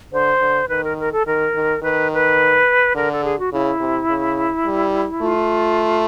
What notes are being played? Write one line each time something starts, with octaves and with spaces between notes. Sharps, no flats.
D3 C5
D3
D#3 B4
A#4
A#4
A4
D#3 A#4
D#3
D#3 B4
B4
D3 A#4
A4
G#4
F#4
C#3 E4
C3
C#3
G3
A3 F4